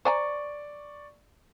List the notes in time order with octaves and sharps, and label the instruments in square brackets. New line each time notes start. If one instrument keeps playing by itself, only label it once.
[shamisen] C5 G#5 A#5 [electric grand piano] D5 C#6